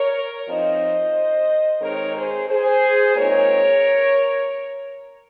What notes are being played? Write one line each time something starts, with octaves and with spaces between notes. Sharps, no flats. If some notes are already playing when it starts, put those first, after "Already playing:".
Already playing: A#4 C#5
F3 C4 D#4 C5 D#5
D#3 G#3 C4 D#4 A#4 C#5
G#4 C5
G#4 C5
A#2 G#3 C4 D#4 A#4 C#5